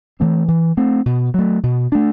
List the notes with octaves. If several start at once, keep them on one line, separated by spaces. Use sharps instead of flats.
E3 A3 C4
E3
A3 C4
B2
F#3 A3
B2
A3 D4